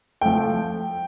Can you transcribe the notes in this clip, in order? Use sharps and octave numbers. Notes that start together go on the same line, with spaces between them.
F3 A3 G5